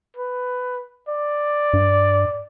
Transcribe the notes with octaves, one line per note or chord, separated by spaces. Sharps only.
B4
D5
G2